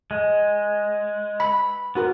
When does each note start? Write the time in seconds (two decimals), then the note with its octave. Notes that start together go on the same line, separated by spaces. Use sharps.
0.11 G#3
1.40 B5
1.95 B3 D#4 F#4 A#4